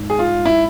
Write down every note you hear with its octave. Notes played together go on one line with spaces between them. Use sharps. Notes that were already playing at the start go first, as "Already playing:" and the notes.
Already playing: G#1
G#4
F4
E4